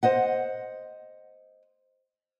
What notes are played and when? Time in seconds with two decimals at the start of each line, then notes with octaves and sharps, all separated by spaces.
0.03 C5 D#5 F#5